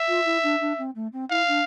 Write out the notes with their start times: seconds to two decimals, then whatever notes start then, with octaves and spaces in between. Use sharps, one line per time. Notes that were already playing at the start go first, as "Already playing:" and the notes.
Already playing: E5
0.08 F4
0.25 E4
0.43 D4
0.60 D4
0.78 C4
0.95 A3
1.13 C4
1.30 E4 F5
1.48 D4